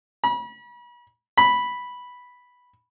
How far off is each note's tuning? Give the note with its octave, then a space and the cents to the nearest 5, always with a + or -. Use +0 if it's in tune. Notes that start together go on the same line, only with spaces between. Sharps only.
B5 -40
B5 -5